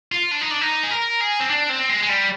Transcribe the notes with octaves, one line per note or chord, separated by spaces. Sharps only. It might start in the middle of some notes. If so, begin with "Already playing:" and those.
F4
D4
D#4
D4
D#4
G#4
A#4
G#4
C4
D4
C4
G#3
G#3
G3